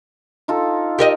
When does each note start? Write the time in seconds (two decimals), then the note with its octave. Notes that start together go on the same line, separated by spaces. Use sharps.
0.48 D#4 F4 A4
0.99 G4 A#4 D#5